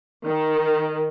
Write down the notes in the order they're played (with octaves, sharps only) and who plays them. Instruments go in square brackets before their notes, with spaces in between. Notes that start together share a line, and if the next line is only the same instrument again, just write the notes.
[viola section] D#3